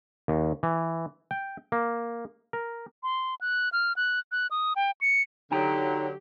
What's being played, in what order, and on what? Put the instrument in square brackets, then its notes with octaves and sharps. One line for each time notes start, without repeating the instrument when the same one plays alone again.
[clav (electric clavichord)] D#2
E3
G5
A#3
A#4
[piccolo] C6
F#6
F6
F#6
F#6
D#6
G5
C#7
[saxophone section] D3 F#3 [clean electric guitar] D#4 G5 A#5 [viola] G4